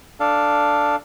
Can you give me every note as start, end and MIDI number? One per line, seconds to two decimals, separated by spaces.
0.20 0.96 62
0.20 0.96 69
0.20 0.96 77